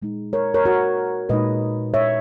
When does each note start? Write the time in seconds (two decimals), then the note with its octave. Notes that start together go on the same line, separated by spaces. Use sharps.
0.02 A#2 G#3 D#4
0.33 A#4 C#5
0.54 A#4 C#5
0.66 F#4 A#4
1.29 A#2 G#3 D#4 B4 D#5
1.94 C#5 E5